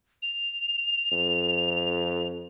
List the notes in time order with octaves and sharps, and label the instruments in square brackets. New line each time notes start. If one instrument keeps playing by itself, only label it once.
[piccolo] F7
[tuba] F2